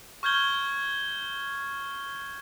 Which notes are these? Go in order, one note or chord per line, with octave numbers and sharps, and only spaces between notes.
C#6 F6 G6 G#6 G7